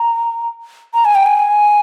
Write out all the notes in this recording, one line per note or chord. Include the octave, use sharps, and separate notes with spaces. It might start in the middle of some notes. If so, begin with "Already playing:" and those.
Already playing: A#5
A#5
G#5
G5
G#5